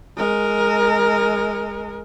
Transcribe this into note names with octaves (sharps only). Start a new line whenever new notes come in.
G#3 A#4